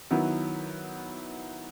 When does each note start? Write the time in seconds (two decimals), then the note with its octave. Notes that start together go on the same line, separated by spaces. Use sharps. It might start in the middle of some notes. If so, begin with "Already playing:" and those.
0.11 D#3 F#3 B3 E4